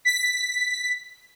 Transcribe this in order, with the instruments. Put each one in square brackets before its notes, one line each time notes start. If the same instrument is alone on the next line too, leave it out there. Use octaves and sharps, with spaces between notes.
[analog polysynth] B6